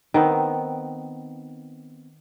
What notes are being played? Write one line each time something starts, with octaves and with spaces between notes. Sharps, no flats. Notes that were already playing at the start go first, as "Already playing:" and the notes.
D#3 B3 C4